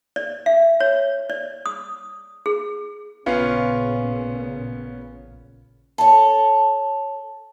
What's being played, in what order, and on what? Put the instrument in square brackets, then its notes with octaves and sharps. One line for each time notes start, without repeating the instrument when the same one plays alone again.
[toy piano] D5
E5
C#5
D5
D#6
G#4
[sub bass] A1 [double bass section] A#2 C#3 [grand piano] B3 C#4 F4
[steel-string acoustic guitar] A4 C#5